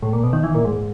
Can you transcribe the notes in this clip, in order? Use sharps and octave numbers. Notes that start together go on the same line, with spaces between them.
A2
A#2
B2
D#3
E3
A#2
G#2